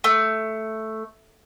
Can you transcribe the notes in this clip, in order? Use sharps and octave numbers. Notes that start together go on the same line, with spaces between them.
A3